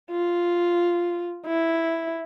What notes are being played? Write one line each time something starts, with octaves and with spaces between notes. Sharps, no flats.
F4
E4